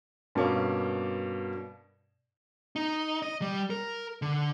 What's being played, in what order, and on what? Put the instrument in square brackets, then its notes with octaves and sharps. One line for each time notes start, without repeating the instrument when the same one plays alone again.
[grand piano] G2 B2 A#3 C#4
[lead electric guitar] D#4
D#5
G3
A#4
D3